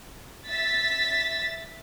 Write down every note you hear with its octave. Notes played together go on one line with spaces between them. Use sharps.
E5 A6 B6